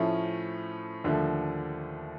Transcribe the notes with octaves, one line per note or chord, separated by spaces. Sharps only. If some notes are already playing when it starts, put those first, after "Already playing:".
Already playing: A2 F3 A3 C#4
D#2 D3 F3 A3